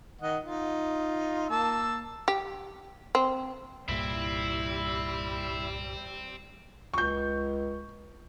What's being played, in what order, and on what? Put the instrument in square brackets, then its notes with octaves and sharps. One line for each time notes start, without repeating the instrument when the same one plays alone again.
[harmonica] D#3 D#5 F#5
D#4 F4
A#3 A5 E6
[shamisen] G4
C4
[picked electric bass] C2 G2 A#2 [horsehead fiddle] G3 [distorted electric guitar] C4 [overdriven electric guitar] E4
[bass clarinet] C#2 [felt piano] C#6 G6